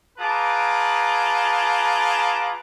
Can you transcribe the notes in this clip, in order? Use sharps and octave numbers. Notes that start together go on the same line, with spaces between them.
F4 G#4 B4 A5 A#5 D6